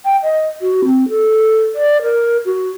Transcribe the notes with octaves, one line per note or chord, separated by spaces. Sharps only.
G5
D#5
F#4
C4
A4
D5
A#4
F#4